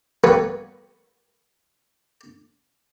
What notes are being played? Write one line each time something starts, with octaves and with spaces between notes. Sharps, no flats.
G3 A#3 B3 B4 C#5